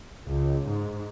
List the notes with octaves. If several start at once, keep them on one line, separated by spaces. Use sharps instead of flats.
C#2
G#2